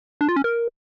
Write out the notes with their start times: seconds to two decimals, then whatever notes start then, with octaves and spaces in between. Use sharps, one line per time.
0.21 D4
0.29 F4
0.36 C#4
0.44 A#4